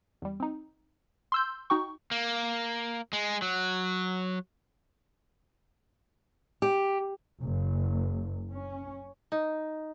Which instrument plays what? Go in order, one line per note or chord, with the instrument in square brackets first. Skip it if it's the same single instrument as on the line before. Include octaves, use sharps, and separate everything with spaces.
[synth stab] E2 G3
C4 D#4
C6 E6 G6
D#4 F#4 G5 C#6
[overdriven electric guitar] A#3
G#3
F#3
[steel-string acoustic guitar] G4
[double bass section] F#1
C#4
[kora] D#4